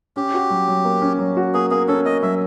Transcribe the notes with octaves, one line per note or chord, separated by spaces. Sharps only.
C#4 G4
F#4
F#3
F#3
A#3
C#4
F#3
F#4
A#3 G#4
A#3 G#4
C#4 A4
A#3 D#5
F#3 E5